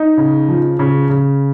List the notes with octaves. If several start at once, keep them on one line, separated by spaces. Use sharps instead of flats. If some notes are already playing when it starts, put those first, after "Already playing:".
Already playing: D#4
C#3
F3
C#3
C#3